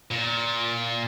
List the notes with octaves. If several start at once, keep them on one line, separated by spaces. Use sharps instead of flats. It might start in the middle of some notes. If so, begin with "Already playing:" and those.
A#2